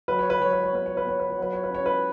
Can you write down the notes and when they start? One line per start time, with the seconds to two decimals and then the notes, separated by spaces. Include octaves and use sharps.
0.08 F#3 B4
0.19 C#5
0.30 B4
0.40 F#3 C#5
0.53 B4
0.64 C#5
0.73 B3 B4
0.86 C#5
0.97 B4
1.06 B3 C#5
1.20 B4
1.30 C#5
1.38 F#3 B4
1.53 C#5
1.63 B4
1.70 C#4 C#5
1.86 B4